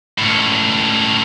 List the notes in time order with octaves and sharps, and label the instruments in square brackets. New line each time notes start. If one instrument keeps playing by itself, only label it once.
[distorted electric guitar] C#2 A2